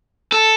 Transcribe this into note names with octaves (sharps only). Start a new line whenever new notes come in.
A4